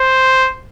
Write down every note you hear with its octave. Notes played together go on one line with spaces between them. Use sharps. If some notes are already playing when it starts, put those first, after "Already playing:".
Already playing: C5